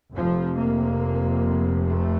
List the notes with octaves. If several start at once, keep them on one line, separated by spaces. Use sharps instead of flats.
F1 F2 C3 F3
A#3
A3